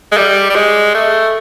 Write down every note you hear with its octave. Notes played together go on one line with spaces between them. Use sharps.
G#3
G3
G3
G#3
A3